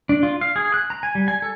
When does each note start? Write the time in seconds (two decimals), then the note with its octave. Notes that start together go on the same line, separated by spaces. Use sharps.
0.09 D4
0.23 F4
0.41 F5
0.56 G#4
0.74 F#6
0.90 A#5
1.03 G#5
1.15 G3
1.28 G#5
1.42 A4